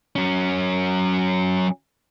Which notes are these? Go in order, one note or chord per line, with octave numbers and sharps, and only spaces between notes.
F#3 C#4